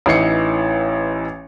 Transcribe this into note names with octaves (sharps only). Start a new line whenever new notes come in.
A1 E3 D#4 C7 C#7